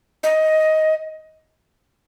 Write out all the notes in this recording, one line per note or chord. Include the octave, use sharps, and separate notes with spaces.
D#5